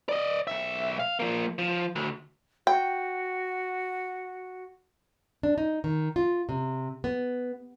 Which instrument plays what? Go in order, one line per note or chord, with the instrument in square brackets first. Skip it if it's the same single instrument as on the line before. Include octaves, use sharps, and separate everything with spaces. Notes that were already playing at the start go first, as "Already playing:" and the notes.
[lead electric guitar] D5 D#5
B1 E5
F5
F3 A#3
F3
D2
[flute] F#4 [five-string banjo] G5
[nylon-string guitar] D4
D#4
D#3
F4
C3
B3